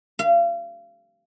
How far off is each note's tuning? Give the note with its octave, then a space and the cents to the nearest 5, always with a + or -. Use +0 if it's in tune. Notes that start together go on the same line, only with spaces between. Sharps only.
F5 -35